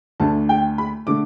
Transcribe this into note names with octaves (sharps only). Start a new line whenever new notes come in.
D2 D3 A3 D4 A5
G5
B5
D3 A3 D4 D6